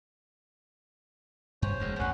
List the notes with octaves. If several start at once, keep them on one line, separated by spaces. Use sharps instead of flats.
G2 C5 C#5
E1 D2 G#3
A1 E2 C#4 F#5